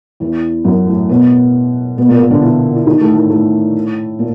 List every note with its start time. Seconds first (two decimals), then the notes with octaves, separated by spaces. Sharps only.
0.20 E2 E3
0.64 F#2 F#3
0.87 A2 A3
1.09 B2 B3
1.97 B2 B3
2.08 A#2 A#3
2.19 A#2 A#3
2.30 D3 D4
2.42 E3 E4
2.76 E4
2.86 D#3 D#4
3.01 A2 A3
3.16 A2 A3
3.30 A2 A3
4.19 A#2 A#3